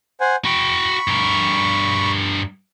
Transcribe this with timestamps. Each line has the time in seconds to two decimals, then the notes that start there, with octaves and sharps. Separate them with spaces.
0.20 C5 F#5 G#5
0.45 F#4 G5 B5 C#6
1.08 G2 A#4